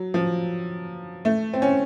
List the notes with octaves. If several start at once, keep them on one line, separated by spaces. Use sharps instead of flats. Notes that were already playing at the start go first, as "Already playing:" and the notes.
Already playing: F#3
F3
A3
C4
C#4